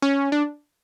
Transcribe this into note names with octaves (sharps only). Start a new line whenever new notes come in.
C#4
D4